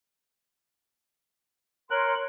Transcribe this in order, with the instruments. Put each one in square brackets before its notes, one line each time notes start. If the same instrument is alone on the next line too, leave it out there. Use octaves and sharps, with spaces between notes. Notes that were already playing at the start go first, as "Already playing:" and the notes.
[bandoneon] A#4 F#6 [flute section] C#5 C6